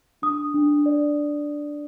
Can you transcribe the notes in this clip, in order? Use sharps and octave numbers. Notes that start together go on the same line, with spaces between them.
D4 D#6
D4
D5